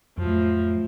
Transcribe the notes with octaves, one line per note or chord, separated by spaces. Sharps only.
F2 A2 F3 F#3